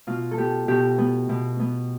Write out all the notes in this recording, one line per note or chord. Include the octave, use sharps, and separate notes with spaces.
B2 F4
A4
B3 G4
B2 G4
B3
B2
B3